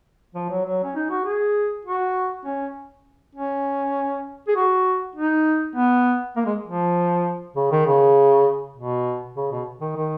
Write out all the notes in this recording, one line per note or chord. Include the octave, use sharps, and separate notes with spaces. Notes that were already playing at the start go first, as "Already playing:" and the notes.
F3
F#3
F#3
C#4
D#4
F#4
G#4
F#4
C#4
C#4
G#4
F#4
D#4
B3
A#3
G#3
F3
C#3
D#3
C#3
B2
C#3
B2
D#3
D#3